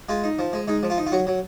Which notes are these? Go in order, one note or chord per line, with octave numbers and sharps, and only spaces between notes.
G#3 F4
D#4
F3
G#3
G#3 D#4
F3
F4
D#4
F4
F#3 F#4
F#3